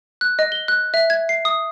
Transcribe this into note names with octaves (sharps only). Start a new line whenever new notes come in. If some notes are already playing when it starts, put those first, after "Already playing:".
F#6
D#5
G7
F#6
E5
G#6
C7
D#6